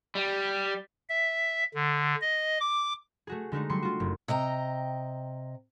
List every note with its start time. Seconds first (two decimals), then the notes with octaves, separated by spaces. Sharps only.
0.15 G3
1.10 E5
1.74 D3
2.21 D#5
2.60 D6
3.27 A3 F#4 G#4
3.52 D3 G#3 A3 D#4
3.69 F#3 G3 C6 C#7
3.83 F4 F#4
4.00 F#1
4.28 C3 D#5 G5 A#5